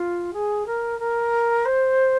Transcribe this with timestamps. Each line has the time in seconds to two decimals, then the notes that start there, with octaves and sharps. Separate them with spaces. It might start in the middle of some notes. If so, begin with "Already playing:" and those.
Already playing: F4
0.33 G#4
0.66 A#4
0.99 A#4
1.65 C5